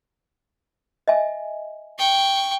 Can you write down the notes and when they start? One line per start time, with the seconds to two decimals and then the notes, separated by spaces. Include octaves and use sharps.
1.08 D#5 E5 G#5
1.98 G5 C#6